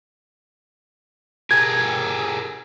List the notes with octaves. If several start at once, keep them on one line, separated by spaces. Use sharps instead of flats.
G4 G#4 A#4 G#6